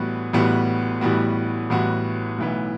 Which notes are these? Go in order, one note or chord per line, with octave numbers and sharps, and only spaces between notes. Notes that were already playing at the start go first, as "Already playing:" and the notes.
Already playing: A1 A2 G3 B3 F#4
A1 A2 G3 B3 F#4
A1 A2 G3 B3 F#4
A1 A2 G3 B3 F#4
B1 A2 E3 B3